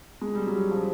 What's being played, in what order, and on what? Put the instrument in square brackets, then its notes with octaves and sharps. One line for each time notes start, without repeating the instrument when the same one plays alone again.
[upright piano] G#3
G3
F#3
F3